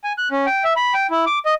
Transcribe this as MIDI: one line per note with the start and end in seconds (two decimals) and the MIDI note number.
0.04 0.13 80
0.18 0.28 90
0.31 0.46 61
0.46 0.64 79
0.64 0.73 76
0.76 0.94 83
0.94 1.07 79
1.10 1.25 64
1.26 1.39 86
1.45 1.54 75